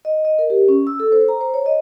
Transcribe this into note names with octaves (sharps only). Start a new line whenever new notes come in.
D#5
D#5
A#4
G4
C#4
E6
A4
C5
A#5
C5
C#5
D#5